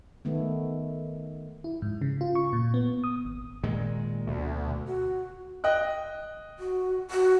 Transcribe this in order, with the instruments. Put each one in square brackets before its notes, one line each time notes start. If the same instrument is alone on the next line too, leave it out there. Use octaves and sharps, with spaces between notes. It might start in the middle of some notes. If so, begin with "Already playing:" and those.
[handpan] D#3 A3 B3
[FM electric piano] E4
G#2
C#3
F4
C#6
A#2
B3
D#6
[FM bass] G#1
[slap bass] A#2 D#3 G#3
[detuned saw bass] D2 [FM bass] B2
[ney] F#4
[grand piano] D#5 G5 F#6
[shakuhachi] F#4
F#4